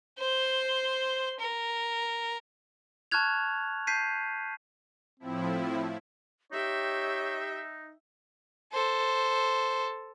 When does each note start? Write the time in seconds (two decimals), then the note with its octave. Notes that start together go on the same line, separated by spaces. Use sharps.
0.19 C5 C6
1.40 A#4
3.11 A5 C#6 F6 F#6 G#6 F7
3.87 A5 G6 B6 C7 D#7
5.20 A2 F3 C4 E4
6.52 D#4 G4 C#5 E5 G5
8.72 A4 C5